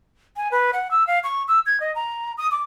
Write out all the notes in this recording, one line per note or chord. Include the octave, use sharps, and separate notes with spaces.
G#5
B4
F#5
E6
F5
C#6
E6
G#6
D#5
A#5
D#6
D6